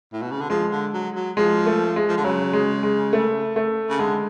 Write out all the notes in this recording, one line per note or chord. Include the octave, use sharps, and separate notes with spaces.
A2
B2
C#3
D3
F3 G#3
D3
F#3
F#3
F3 G#3
A3
G#3
F3
D3
C#3 F#3
G#3
G#3
A3
A3
C#3
D3 G#3